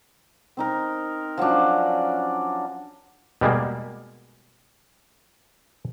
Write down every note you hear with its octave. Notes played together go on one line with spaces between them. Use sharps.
C4 D#4 A#4
F3 F#3 C#4 D4
B2 G3 G#3 A#3